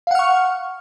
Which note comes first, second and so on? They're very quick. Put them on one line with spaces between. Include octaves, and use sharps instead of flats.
F5 F#5 F6 C#6